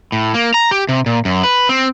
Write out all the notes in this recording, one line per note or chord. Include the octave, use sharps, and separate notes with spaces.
A2
A#3
A#5
G4
C3
A#2
F#2
B4
C4